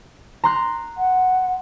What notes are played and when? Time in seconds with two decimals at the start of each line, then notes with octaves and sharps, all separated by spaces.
0.44 A#5 C6 F#6
0.98 F#5